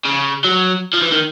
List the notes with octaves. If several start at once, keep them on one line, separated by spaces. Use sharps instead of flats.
C#3
F#3
F3
E3
D#3